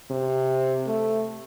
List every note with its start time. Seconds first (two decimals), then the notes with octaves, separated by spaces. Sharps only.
0.11 C3
0.87 A3